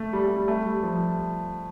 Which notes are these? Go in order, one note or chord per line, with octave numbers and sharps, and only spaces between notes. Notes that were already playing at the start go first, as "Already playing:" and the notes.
Already playing: A3
G3
A3
G3
A3
G3
F3